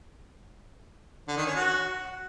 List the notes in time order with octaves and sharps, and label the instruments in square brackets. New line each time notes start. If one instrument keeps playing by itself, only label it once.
[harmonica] D3
D#3
C#4
F#4